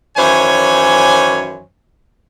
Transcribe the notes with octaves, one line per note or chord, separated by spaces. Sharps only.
F#2 D#3 E3 C5 C#5 G#5